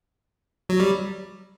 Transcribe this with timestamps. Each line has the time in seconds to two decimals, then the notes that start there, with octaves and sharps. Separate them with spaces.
0.69 F#3
0.80 G3